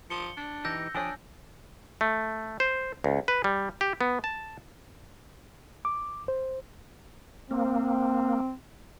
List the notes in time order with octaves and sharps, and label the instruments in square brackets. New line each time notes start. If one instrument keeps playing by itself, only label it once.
[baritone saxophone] F3 [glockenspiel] C#7 G7
[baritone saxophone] D4
[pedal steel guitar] E3 D#4 G4 [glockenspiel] E6 G6 A#6
[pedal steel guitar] F3 G5 D#6 [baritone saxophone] D4 [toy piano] C#5 G#5
[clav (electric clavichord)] A3
C5
C#2
B4
G3
G4
B3
A5
[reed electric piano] D6
C5
[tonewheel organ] A#3 [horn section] C4